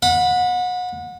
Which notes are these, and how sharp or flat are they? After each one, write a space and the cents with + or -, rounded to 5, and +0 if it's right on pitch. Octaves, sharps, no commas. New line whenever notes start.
F#5 -30 B5 +0